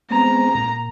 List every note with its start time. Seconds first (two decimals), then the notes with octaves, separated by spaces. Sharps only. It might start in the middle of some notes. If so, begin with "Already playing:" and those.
0.11 G#3 B3 C4 A#5
0.55 A#2